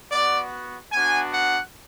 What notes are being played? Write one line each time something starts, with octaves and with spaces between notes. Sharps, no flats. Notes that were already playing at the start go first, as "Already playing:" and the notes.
B3 F#4 D5
B3 D4 F#4 G#5
F#5